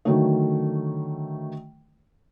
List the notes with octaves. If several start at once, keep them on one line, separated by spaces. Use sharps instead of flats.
D3 D#3 F#3 A3